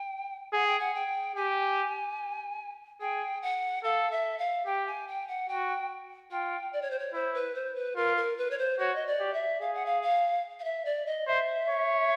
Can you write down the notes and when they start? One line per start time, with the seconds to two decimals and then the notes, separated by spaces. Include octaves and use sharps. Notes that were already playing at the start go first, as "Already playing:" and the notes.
Already playing: G5
0.53 G#4 F#5
0.66 G5
0.79 F#5
0.95 G5
1.36 G4 G#5
3.01 G#4 G5
3.42 F#5
3.83 A4 F5
4.11 E5
4.38 F5
4.66 G4 G5
4.87 G#5
5.08 G5
5.28 F#5
5.49 F#4 G5
6.31 F4 G5
6.73 D5
6.82 C#5
6.90 C5
6.99 C#5
7.13 E4 C5
7.34 B4
7.55 C5
7.75 B4
7.96 F4 A#4
8.17 A#4
8.37 B4
8.51 C#5
8.58 C5
8.79 F#4 C#5
8.95 D#5
9.06 D5
9.20 G4
9.33 E5
9.61 G#4 F5
9.74 F#5
9.85 F5
10.02 F5
10.59 F5
10.64 E5
10.85 D5
11.06 D#5
11.27 C5 E5
11.68 C#5